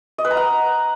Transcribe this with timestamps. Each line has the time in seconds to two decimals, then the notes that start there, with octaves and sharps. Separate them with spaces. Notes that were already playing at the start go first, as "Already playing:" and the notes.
0.18 D#5
0.25 B4
0.31 A#5
0.37 F#5